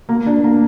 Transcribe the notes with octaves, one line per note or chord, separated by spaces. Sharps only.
A#3
D4
A#3